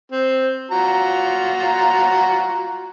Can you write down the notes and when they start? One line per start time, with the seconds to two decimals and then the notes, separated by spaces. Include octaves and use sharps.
0.12 C4
0.71 F4 F#4 A#5